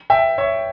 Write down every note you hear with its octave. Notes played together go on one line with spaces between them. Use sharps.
E5 G5
C#5 E5